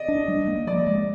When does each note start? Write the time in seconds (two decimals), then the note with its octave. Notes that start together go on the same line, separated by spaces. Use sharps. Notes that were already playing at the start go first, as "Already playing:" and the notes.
Already playing: D5 D#5
0.08 D4
0.28 G3
0.47 A#3
0.67 F3 D5
0.87 G#3